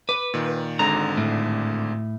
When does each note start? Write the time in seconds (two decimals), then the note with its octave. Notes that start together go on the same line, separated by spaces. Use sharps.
0.09 B4 D6
0.34 A#2 D#3
0.79 G#1 G#2 D3 A#5
1.17 A2